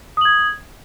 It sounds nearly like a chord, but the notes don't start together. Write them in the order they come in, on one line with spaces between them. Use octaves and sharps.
D#6 F#7 G#6